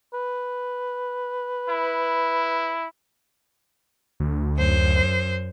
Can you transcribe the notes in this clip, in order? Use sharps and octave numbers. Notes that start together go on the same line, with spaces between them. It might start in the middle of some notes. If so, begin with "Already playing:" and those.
B4
E4
D2
F#2 C5